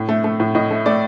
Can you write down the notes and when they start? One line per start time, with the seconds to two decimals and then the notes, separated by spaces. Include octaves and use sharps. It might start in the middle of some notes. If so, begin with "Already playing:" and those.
Already playing: A2
0.09 A3
0.24 A3
0.40 A2
0.55 A2 D#5
0.71 A3
0.86 A3 D5